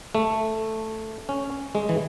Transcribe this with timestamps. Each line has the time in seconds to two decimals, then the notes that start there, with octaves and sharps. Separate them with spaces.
0.15 A3
1.29 C#4
1.75 G#3
1.89 E3